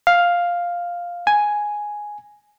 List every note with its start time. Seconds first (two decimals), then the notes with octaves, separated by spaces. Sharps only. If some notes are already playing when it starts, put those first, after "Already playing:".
0.07 F5
1.27 G#5